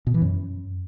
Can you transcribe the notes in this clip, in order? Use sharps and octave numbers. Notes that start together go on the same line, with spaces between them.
B2
E3
F#2